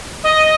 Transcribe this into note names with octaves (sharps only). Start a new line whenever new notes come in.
D#5